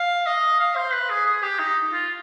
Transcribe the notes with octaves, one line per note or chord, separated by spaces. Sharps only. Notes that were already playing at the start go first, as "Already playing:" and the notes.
Already playing: F5
D#5
F5
C5
B4
G#4
G#4
G4
D#4
F4